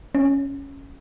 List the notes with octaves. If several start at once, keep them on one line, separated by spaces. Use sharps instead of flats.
C#4